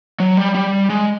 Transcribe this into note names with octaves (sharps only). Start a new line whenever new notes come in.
F#3
G3
G3
G#3